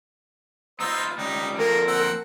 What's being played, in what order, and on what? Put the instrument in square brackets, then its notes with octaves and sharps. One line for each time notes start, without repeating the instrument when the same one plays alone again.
[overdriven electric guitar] B3 F4 [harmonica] D#4 C5 E6
[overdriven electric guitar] C#2 G3 [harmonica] D#4
[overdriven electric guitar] F2 A#2 [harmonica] A#3 [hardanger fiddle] A4 A#4
[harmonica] C4 F#5 E6